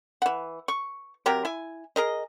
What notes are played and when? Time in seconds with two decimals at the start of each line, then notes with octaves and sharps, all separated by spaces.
0.22 E3 F#5
0.68 C#6
1.26 C3 F#3 G4 A#4
1.45 E4 G#5
1.96 G#4 A#4 D#5